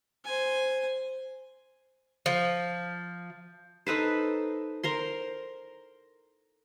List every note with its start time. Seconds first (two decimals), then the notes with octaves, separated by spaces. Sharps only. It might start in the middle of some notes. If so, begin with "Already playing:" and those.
0.24 C5 G#5
2.26 F3
3.87 D#4 A4 B4 C5
4.83 A#4 C5 C6